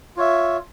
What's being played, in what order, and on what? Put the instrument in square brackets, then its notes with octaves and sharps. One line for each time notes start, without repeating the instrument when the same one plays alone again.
[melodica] F4 C#5 E5